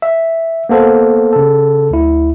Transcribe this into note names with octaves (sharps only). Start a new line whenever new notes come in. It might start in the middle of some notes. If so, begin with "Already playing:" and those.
E5
A#3 B3 A4 C5
C#3 A4
D2 E4